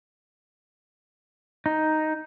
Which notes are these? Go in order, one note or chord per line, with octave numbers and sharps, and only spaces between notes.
D#4